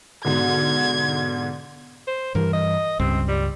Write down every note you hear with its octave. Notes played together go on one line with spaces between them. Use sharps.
G#2 B2 D3 G#6
C5
G2 E3 A#4
D#5
C#2 G2 C4
G3